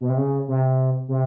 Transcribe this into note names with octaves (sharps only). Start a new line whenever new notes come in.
B2
C3
C#3
C3
C3